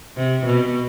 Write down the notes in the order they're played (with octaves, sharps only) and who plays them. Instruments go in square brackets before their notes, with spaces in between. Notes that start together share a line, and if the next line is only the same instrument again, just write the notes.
[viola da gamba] C3
B2